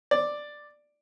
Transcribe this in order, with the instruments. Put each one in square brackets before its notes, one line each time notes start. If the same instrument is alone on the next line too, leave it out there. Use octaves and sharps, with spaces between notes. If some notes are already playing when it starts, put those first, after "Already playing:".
[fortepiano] D5